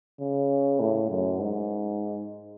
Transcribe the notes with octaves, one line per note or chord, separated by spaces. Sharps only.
C#3
A2
F#2
G#2